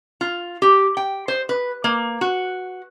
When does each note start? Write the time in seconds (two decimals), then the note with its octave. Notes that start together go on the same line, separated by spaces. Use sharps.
0.21 F4
0.62 G4
0.97 G5
1.28 C5
1.49 B4
1.84 A#3
2.21 F#4